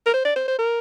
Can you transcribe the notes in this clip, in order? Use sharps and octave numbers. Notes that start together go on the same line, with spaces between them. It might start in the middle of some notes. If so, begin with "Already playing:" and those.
A#4
C5
D5
C5
C5
A#4